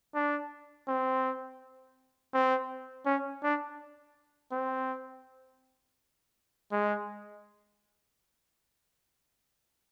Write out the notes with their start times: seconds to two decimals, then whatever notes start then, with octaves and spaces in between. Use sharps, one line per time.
0.15 D4
0.88 C4
2.34 C4
3.06 C#4
3.43 D4
4.52 C4
6.72 G#3